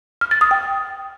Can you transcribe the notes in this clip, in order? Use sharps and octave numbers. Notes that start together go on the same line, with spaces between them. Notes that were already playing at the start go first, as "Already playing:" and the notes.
F6
A6
D#6
G5